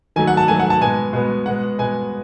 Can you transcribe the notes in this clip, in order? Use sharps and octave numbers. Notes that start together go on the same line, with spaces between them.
D#3 F#3 A3 G#5
F#5
A5
D#3 F#3 A3 G#5
F#5
A5
B2 G#3 B3 G#5
B2 G#3 B3
B2 G#3 B3 F#5
B2 G#3 B3 G#5